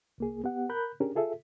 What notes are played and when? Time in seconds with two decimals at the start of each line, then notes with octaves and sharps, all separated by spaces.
0.18 C2 A#3 G#4
0.44 B3 G4 F#5
0.69 A#4 B5 F#6 G6
1.00 C#4 D4 G4 G#4 A#4
1.15 F4 G#4 A4 E5